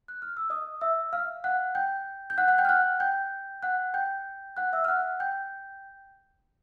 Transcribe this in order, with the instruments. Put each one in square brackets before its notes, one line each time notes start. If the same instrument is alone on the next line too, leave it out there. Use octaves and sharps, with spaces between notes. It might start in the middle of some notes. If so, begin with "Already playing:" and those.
[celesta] F#6
F6
E6
D#5 D#6
E5 E6
F5 F6
F#5 F#6
G5 G6
G6
F#5 F#6
F#5 F#6
G5 G6
F6
F#5 F#6
G5 G6
F#5 F#6
G5 G6
F#5 F#6
E5 E6
F6
F#5 F#6
G5 G6